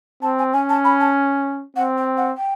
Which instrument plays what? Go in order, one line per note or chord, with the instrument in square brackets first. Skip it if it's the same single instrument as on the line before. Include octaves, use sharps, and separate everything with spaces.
[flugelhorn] C4 [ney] A5
[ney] G#5
[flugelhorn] C#4 [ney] G#5
[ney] A5
B5
A5
[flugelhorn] C4 [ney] F#5
[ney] G5
F#5
G5